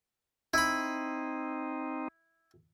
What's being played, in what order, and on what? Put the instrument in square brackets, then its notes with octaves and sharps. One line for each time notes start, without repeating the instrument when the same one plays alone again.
[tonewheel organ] C4 D#4 [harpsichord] E4 B5